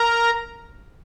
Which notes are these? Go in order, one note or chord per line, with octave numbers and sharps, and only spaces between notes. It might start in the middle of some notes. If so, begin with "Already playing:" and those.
Already playing: A#4 A#5